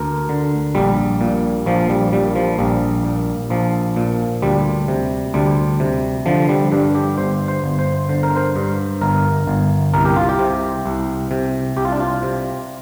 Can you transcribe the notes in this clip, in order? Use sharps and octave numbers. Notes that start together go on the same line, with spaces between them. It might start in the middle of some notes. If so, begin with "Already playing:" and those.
Already playing: D2 A#4
D3
A#1 G3
A#2
A#1 F3
G3
A#2 G3
F3
A#1 G3
A#2
A#1 F3
A#2
D2 G3
C3
D2 G3
C3
D3 F3
G3
G2 D4
G4
G1 C5
C5
G1
C5
D3 C5
A#4
C5
G2
G1 A#4
G1
C2 A#4
G4
F4
G4
C3
C2
C3
C2 G4
F4
D4
F4
C3